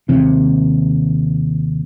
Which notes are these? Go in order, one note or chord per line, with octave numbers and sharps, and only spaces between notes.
D#2 C3